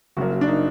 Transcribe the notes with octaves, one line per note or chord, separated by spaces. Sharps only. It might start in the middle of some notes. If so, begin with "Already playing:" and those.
F#1 F#2 F#3 A#3 F#4
F#4
D4
D#4